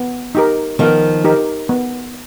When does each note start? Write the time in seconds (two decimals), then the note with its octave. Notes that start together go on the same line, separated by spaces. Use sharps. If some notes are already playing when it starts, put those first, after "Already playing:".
Already playing: B3
0.35 D#4 G4 A#4
0.79 D#3 F3 B3
1.24 D#4 G4 A#4
1.69 B3